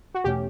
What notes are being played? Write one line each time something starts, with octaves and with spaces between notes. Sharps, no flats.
F#4
E2 B2 A3 C#4 G4